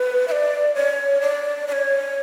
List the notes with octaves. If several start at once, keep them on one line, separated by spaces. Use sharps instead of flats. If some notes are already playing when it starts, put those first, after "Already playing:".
Already playing: B4
E5
D5
C#5
D5
D5
C#5